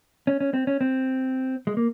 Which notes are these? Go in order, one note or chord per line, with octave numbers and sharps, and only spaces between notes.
C#4
C#4
C4
C#4
C4
G#3
A#3